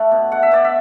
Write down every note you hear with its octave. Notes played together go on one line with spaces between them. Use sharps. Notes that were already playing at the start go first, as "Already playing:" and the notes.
Already playing: A3 D4
B2
A3 F#5
E5
B2 D5
E5